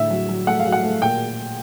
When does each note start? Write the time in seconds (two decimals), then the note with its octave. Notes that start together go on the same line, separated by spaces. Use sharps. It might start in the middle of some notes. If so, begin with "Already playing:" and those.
Already playing: A2 D3 E5
0.10 F#3
0.29 F#3
0.47 A3 F#5
0.60 F5
0.65 F#3
0.72 F#5
0.84 A3
1.02 A#2 G5